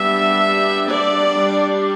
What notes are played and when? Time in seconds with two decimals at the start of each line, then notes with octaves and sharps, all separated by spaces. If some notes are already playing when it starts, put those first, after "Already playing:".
Already playing: G3 B3 D4 E5
0.90 D5
1.30 G3 D4